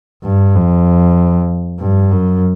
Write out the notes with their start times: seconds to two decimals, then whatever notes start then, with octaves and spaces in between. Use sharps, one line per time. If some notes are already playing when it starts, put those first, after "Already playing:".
0.23 G2
0.55 F2
1.79 G2
2.11 F#2